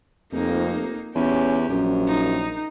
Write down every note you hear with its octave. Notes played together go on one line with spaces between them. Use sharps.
F1 F2 A#3 D#4
E2 C#4 G4
A#1 F#2
D#4